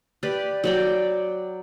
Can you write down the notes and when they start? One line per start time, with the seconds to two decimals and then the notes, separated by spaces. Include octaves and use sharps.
0.23 G4 B4 D5
0.64 F#3 D5 G5